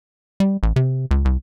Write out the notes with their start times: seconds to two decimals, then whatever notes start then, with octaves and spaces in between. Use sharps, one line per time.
0.40 G3
0.63 A1
0.76 C3
1.11 C#2
1.25 C2